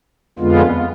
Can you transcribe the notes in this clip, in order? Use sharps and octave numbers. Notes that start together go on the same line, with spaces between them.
F2 D3 G#3 B3 F4